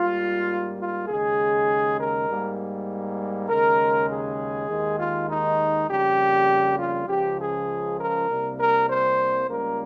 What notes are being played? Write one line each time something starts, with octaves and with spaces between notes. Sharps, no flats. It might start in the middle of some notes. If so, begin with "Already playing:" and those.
Already playing: G#2 G3 A#3 F4
F4
D#2 C#3 G#3 G#4
A#4
G#2 G3 A#3
D#2 C#3 G#3 A#4
G#4
D#2 D#3 G#3
F4
D#4
F2 C#3 G3 A#3 G4
F4
C#2 C#3 F3 G4
G#4
A#4
C2 C3 G3 A#3
A#4
C5
C#2 C#3 G3 A#3 A#4